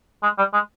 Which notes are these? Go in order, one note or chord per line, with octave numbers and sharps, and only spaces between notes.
G#3
G3
G#3